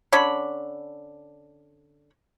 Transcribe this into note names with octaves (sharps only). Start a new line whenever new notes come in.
D3 C#4 D4 B5